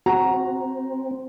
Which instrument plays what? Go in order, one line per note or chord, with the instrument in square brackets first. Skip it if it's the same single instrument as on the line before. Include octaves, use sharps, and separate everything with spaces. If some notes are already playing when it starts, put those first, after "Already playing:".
[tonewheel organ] C4 [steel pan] F#4 [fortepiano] A#5